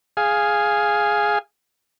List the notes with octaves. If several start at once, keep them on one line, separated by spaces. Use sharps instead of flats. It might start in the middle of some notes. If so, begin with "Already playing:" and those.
G#4 F5 G#5